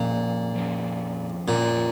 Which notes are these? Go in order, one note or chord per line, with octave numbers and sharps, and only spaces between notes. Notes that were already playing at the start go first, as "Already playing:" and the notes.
Already playing: F2 A#2 F3 C#4 G#4
F2 F3 C#4 G#4
F2 A#2 F3 A#3 C#4